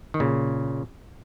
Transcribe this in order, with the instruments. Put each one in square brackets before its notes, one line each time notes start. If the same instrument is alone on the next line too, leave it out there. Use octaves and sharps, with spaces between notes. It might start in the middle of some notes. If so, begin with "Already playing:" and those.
[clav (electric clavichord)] D#3
A#2 C#3